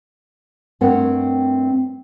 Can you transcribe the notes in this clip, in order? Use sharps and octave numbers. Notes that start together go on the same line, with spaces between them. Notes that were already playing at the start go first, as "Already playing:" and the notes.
G2 A3 C4 A#4 C#5 F#5